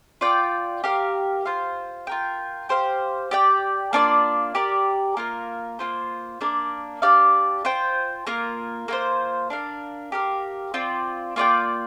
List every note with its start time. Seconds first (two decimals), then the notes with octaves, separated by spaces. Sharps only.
0.21 F4 D5 G5
0.84 G4 A#4 F5
1.45 F4 C5 F5
2.07 F4 A#4 G5
2.69 G4 C5 F5
3.31 G4 D5 G5
3.93 A#3 D4 F4 D5
4.55 G4 A#4 D5
5.17 A#3 F4 A#4
5.79 A#3 F4 C5
6.41 A#3 D4 A#4 D5
7.02 D4 G4 D5 F5
7.65 F4 C5 G5
8.27 A#3 F4 A#4
8.88 A#3 F4 C5
9.50 D4 A#4 F5
10.12 G4 A#4 F5
10.74 C4 F4 D5
11.36 A#3 F4 D5 G5